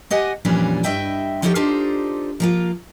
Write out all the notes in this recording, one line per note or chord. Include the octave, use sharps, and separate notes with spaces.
G4 D#5 F#5 G#5
F2 A#2 E3 G3 C#4 D4
G2 D#5 E5 G5
F3 D#4 E4 G4 A4 C#5
D4 D#4 F4 G4 A4 C5
F3 A#3 F4